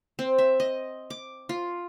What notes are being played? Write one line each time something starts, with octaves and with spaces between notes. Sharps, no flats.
C4
E5
D#5
D6
F4